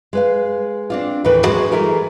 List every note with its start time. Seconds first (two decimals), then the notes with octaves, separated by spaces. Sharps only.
0.13 G#3 B4 F5
0.90 C4 D4 F4
1.25 D#2 A2 E3 B4 G5
1.44 F#3 G#3 F#4 G#4
1.72 E3 G3 A3 E4 G#4 A#4